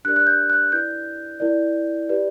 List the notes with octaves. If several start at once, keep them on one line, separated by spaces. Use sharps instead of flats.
D4 G4 A#4 D5 F#6
F#6
G6
F#6
E4 B4 D5 G6
E4 A#4 D5
G4 B4 D5